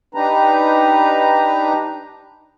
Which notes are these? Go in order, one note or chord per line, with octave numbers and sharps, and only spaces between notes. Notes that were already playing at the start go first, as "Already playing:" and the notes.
D4 D#4 G4 B4 A#5